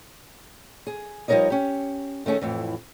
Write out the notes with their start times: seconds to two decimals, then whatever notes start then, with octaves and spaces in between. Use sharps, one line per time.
0.87 G#4
1.28 F3 G3 D#4 A#4 C#5 D#5
1.50 C#4 G4
2.26 D#3 A3 C#4 G#4
2.41 F2 A2 E3